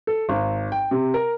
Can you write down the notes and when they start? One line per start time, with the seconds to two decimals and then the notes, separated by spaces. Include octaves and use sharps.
0.07 A4
0.29 G#1
0.72 G5
0.91 C3
1.14 A#4